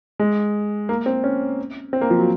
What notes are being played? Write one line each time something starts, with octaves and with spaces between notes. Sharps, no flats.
G#3
A#3
C4
C#4
C4
A#3
F3
F#3